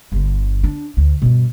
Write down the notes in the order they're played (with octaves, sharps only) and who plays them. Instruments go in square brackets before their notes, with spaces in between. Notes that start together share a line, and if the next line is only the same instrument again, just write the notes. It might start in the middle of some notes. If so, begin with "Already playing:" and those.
[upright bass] G1 D3
D4
D2
G2 B2